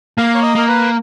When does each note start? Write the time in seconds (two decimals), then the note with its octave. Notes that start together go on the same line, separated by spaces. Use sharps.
0.18 A#3 F5
0.35 C#5
0.42 D#5
0.55 A#3 A#4
0.68 B4